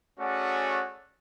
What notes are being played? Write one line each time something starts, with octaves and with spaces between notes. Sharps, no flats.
A3 C#4 F#4 G#4 D5 F#5